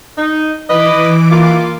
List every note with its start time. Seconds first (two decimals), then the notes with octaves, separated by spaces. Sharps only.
0.17 D#4
0.69 E3 B4 D#5 D6
1.30 A#3 F4